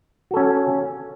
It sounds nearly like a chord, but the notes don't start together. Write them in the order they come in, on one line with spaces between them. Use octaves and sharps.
F#4 A4 C#4